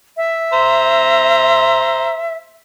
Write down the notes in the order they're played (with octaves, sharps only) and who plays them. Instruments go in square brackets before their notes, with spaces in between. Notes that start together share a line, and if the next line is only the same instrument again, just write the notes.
[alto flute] E5
[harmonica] C5 A#5